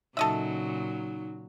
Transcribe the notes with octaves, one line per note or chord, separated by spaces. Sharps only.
A#2 C#3 F#3 D#4 A4 D#5 E5